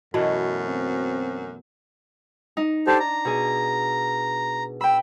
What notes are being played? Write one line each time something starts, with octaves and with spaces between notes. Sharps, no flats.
F#2 B2 E3 A3 F#4
C4
D#4
D4 G4 A4 C5
A#5
B2 G#4
G5 B5 E6